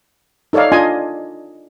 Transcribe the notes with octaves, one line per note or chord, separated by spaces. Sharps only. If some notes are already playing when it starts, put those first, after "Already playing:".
D#4 A4 C#5 D5 F5
D4 F4 D#5 G#5 C6